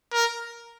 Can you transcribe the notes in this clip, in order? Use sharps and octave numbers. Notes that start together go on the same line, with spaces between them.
A#4